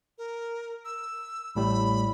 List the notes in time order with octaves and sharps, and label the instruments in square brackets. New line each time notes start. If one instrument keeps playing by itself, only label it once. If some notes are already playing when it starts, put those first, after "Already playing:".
[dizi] A#4
E6
[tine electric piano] A1 A2 G3 [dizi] B5